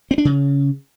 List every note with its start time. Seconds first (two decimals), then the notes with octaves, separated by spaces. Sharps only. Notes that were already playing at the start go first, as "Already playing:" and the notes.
0.11 C4
0.18 D4
0.25 C#3